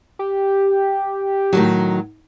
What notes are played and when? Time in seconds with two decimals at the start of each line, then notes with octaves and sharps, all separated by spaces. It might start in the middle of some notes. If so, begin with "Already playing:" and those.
0.19 G4
1.53 A2 D#3 F#3